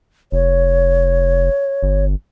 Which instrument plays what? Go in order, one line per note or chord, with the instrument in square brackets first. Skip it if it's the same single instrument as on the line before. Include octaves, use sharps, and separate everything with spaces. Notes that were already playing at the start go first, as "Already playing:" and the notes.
[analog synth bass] F1 [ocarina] C#5
[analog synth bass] G1